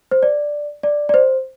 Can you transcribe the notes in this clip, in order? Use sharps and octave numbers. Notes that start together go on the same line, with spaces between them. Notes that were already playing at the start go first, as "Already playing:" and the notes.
C5
D5
D5
D5
C5